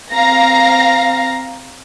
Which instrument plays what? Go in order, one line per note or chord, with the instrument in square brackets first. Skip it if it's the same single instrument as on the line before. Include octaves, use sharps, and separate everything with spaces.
[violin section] C4 F5 A#5 A#6